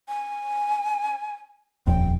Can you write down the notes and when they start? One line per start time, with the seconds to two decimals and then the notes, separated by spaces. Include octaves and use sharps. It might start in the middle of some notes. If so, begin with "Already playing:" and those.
0.08 G#5
1.87 D#1 F2 G5